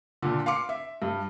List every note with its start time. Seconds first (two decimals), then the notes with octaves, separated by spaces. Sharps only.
0.22 A#2 D3
0.46 F5 C6 D6 C#7
0.69 E5
1.02 G2